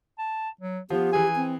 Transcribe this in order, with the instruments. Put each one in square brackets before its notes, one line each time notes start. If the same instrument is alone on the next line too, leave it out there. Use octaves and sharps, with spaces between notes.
[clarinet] A5
F#3
[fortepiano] F3 F4 [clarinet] B3 [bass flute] G4
[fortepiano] E3 G#4 [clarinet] G#5
[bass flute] C4